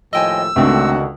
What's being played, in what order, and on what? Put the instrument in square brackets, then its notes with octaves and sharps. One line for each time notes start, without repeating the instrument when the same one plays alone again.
[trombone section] D#2 A2 F3 [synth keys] D#5 G5 G#5 [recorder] E6
[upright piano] C#2 [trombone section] D3 D#3 F#4 [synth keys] A3 C4 D4